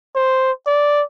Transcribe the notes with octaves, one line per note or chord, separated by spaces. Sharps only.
C5
D5